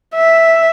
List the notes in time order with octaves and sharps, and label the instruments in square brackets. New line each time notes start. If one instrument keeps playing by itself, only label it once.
[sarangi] E5